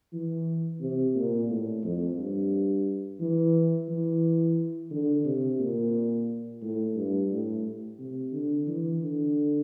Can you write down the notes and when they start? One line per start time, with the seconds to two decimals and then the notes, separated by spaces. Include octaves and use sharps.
0.13 E3
0.81 C3
1.15 A#2
1.49 A2
1.84 F2
2.18 G2
3.20 E3
3.89 E3
4.90 D3
5.25 C3
5.59 A#2
6.61 A2
6.95 G2
7.30 A2
7.98 C3
8.32 D3
8.67 E3
9.01 D3